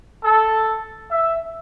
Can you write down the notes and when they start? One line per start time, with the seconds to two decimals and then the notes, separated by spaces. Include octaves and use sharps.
0.24 A4
1.11 E5